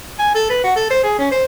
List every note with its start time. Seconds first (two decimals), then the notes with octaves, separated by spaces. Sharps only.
0.19 G#5
0.35 A4
0.50 B4
0.64 F#4
0.76 A4
0.90 C5
1.03 G#4
1.18 C#4
1.31 C5